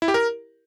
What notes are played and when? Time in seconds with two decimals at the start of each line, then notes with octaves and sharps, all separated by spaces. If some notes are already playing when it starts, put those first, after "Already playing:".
0.02 E4
0.08 G4
0.14 A#4